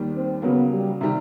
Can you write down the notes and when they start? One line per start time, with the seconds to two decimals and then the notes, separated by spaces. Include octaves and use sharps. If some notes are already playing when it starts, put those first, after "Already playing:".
Already playing: D#2 D#3 G3
0.14 C4
0.42 C#3 F#3 A#3 B3
0.71 G3
1.01 C3 D#3 G3